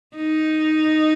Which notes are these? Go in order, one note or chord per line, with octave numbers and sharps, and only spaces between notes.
D#4